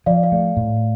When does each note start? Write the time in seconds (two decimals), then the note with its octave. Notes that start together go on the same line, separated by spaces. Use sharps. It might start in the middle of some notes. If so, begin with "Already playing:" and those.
0.06 F3 D5 F5
0.23 D5 F5
0.32 A3
0.57 A2